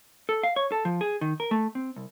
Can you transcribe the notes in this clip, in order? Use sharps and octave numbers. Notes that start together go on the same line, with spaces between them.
A4
F5
C#5
A4
F3
G#4
D#3
A#4
A3
C4
C2